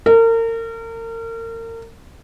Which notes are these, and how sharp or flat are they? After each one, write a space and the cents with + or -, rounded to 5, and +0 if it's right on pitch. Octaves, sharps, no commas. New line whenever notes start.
A#4 -35